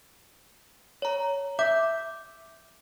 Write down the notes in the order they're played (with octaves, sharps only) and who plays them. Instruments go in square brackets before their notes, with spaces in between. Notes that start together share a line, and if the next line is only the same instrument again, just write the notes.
[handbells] C#5 A#5
[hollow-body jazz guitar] E5 [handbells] D6 G6